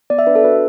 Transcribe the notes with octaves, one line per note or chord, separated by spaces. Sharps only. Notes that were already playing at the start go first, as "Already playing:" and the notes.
B3 D5
E5
D4 B4
A4
F#4 B4